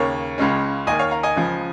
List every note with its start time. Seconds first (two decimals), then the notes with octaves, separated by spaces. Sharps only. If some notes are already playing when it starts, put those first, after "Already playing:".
Already playing: D#2 C#3 A#3 C#5
0.38 C#2 C#3 G#3 C#4
0.87 D#2 D#3 A#3 D#5 G#5
0.99 C#5 F5
1.11 F5 A#5
1.23 D#5 G#5
1.36 C#2 C#3 F3